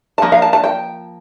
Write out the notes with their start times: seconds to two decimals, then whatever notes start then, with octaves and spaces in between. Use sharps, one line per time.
0.18 A5
0.22 F3 A#3
0.32 F5
0.42 A5
0.53 A5
0.64 G5